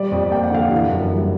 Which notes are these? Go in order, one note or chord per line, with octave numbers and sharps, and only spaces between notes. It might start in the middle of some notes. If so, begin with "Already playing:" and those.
Already playing: G3 D5
F2
A#3 G5
F#5
D3 F5
F#5
E3
F#2
G3